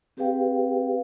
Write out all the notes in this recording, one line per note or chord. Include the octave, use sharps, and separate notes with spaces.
C4 G4 G#4 B4 F5 G5